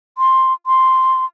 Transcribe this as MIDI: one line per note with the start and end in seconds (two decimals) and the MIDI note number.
0.18 0.53 84
0.66 1.25 84